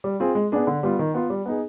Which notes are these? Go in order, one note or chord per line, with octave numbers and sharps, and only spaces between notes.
G3
C4 F4 G#4
G#3
B3 D4 G#4
D3
G3 B3 F4
D#3
B3 F4
G3
B3 D#4 G#4